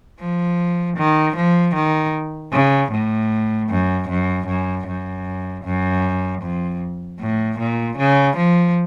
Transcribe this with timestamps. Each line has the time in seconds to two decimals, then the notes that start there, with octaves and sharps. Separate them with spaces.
0.19 F3
0.98 D#3
1.36 F3
1.75 D#3
2.52 C#3
2.92 A2
3.69 F#2
4.09 F#2
4.47 F#2
4.87 F#2
5.64 F#2
6.42 F2
7.20 A2
7.59 A#2
7.98 C#3
8.37 F3